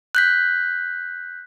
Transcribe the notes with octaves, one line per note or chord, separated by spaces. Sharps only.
F#6 G6 B6